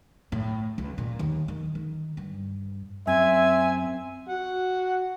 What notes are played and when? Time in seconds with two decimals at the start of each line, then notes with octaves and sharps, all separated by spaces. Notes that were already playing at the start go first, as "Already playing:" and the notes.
0.32 A2
0.78 C#2
0.98 A#2
1.19 D#2
1.48 D#3
1.75 D#3
2.17 G2
3.07 F#2 C4 E5 G#5
4.29 F#4 F#5